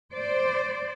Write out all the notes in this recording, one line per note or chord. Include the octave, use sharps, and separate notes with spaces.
C5 D5